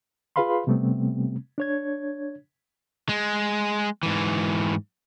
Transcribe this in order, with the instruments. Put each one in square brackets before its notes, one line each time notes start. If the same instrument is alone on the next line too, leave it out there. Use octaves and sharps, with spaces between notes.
[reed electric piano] F4 G#4 B4 F5 B5 C6
C3 G3 A3 B3 C4
D4 C#5 G#6
[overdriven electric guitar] G#3
G#2 E3